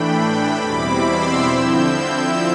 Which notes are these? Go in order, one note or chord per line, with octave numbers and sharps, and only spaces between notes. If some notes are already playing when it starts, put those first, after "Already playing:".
Already playing: A2 E3 A3 D4 G5 B5
E2 B2 G3 C4 E4 B5 D6
C6 E6
D3 F3 C4 E4 E6 G6